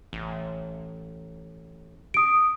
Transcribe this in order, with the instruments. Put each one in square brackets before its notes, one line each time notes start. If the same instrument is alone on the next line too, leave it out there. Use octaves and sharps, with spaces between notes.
[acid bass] A1
[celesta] D#6 D7